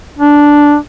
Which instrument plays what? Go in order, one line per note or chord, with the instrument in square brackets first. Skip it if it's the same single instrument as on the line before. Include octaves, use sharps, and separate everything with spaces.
[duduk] D4